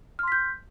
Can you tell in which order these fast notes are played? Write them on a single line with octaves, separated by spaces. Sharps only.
F6 C6 B6 G6